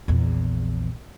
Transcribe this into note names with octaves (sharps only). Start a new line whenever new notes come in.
A#1 E2